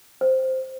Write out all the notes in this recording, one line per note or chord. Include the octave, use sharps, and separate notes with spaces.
C5